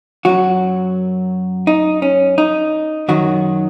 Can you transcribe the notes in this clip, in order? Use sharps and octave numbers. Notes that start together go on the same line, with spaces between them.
F#2 F#3 F#4
D#4
C#4
D#4
F#2 D#3 F#3 F#4